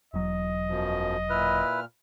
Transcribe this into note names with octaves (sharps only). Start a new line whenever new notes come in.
E1 F#3 D#5
F#2 B2 F3
A#2 E4 B4 F6